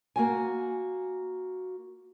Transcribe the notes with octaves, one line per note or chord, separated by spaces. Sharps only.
A#3 F#4 G#5